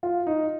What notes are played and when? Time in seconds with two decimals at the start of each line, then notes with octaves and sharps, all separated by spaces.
0.03 F4
0.27 D#4